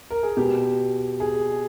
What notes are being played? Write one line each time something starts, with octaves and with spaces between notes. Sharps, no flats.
A#4
G#4
B2 G4
G#4